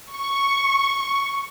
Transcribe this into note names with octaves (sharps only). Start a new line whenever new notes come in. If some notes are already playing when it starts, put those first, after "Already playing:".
C#6